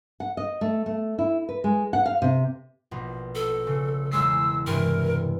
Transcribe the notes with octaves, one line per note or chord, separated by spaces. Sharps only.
F#5
D#5
A3
A3
E4
B4
G#3
F#5
F5
C3
A#1 B2
A4
C#3
E1 G#3 E6 C7
G2 C3 E3 A#4